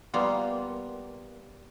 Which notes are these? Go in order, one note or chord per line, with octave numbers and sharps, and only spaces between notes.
G3 A#3 B3 F4